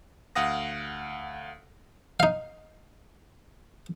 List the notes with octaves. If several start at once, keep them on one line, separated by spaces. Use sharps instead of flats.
D2 F5 F#5 D#6 A#6
D#4 F5